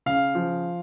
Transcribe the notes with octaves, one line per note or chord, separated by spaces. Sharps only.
C#3 F5
F3